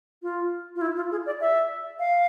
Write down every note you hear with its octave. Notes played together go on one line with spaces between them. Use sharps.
F4
F4
E4
F4
G#4
D5
E5
F5